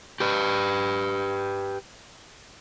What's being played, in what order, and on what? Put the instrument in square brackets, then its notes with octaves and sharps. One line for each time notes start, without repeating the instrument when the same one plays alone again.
[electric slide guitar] G4 B4